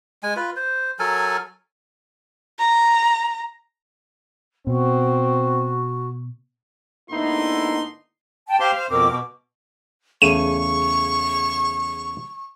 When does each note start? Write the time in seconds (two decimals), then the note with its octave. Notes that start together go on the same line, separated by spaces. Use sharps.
0.23 G#3 G#5
0.36 F4 B4
0.56 C5
0.99 F#3 A4 A#4 G#5
2.59 A#5
4.67 B2 C4 F#4
7.11 G#2 D3 A#3 B3 D#4 E4 C6
8.47 G5 A5
8.60 G4 C5 F5 C6
8.77 C5
8.90 F2 B2 C4 A#4 D6
9.08 B2
10.22 E2 C#3 A3 C#6 D#7